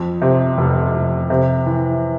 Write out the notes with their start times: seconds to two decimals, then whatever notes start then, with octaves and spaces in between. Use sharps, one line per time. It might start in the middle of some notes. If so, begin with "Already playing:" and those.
Already playing: F2
0.22 C3
0.58 F1
0.94 F1
1.30 C3
1.66 E3